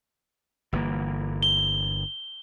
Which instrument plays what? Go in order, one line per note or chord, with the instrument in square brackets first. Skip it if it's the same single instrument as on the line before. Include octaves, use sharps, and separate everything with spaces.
[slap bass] G1 E3 A#3
[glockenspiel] G7